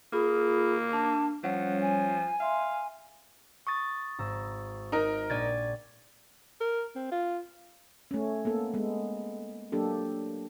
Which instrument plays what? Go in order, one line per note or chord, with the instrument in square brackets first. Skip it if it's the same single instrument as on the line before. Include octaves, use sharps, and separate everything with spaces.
[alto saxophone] A#3 [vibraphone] F4 B5 [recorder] G#4
[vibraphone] D4 [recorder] A5
[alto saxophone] F3 [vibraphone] G3 C#4 C#5 [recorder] F#5
[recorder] G#5
[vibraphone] E5 C6 [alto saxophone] F5
[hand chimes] C#6 D#6 A6
[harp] G#1 A#5 E6
[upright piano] D#4 A#4
[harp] A#1 [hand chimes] D5 G#6 A6
[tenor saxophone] A#4
C4
F4
[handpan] A3 C#4
A#3 B3 A4
G#3 B3
F#3 A#3 D4 G4 A4